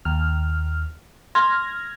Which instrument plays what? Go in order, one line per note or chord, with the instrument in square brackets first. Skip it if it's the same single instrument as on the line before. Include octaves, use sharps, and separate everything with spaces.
[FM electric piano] D#2 F6
[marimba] C6 [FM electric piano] F6 G#6 A#6